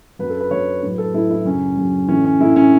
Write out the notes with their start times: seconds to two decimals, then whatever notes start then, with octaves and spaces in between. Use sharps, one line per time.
0.19 F#2 F#3 B4
0.30 A4
0.41 B4
0.51 F#2 F#3 C#5
0.83 A2 F#3 B4
0.98 A4
1.14 A2 F#3 E4
1.30 E4
1.45 F#2 C#3 F#3 C#4
1.77 F#2 C#3 F#3
2.08 A2 E3 C#4
2.25 C#4
2.41 A2 E3 E4
2.56 C#4